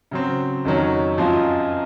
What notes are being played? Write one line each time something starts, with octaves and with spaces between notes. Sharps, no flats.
C#3 F#3 C4
F2 D#3 F#3 C#4
F#2 F3 G#3 C4 F4